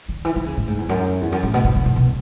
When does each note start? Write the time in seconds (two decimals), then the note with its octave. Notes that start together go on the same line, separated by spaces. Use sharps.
0.09 D3
0.25 E3
0.36 D3
0.46 C#3
0.57 A2
0.68 G#2
0.78 E2
0.89 F#2
1.21 E2
1.32 F#2
1.43 A2
1.54 B2
1.64 B2
1.75 B2
1.85 B2
1.96 B2